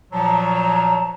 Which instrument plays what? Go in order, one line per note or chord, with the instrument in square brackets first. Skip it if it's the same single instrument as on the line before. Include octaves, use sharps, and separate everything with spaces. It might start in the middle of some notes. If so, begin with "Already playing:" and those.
[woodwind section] A#2 F3 F#3 [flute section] A5 A#5